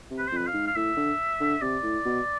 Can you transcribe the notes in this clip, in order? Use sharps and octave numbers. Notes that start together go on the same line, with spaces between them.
C3
B4
C5
F2 B4
F5
G#2
F5
A2 E5
D3
D3
C3 D5
A2
B2